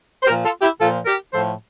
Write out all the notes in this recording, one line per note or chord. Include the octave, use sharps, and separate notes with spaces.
C5
A#2 F3 G4 A#4
F4 A4
E4 G4
A#2 F3 F4 A4
G4 A#4
A2 F3 A4 C5